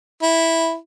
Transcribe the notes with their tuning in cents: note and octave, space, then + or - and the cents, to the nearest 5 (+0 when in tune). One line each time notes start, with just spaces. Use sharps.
E4 -5